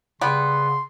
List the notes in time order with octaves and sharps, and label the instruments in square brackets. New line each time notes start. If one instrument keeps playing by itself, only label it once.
[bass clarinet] C#3 [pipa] G3 B3 [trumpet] C6